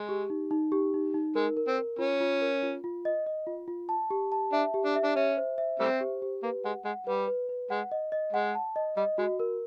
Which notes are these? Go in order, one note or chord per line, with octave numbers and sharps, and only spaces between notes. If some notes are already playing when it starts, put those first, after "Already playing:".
Already playing: G#3
G4
D#4
D#4
G4
D#4
D#4
G#3 A#4
A#4
C4
A#4
C#4 F4
F4
A#4
F4
F4
D#5
D#5
F4
F4
A5
G4
A5
D4 E5
G4
D4
E5
D4
C#4 E5
C5
E5
G3 A3 C4 C5
G4
G4
A#3 B4
G#3 F#5
G#3 F#5
G3 B4
B4
B4
G#3 F#5
D#5
D#5
G#3 F#5
A5
D#5
G3 D#5
G#3 F#4
A#4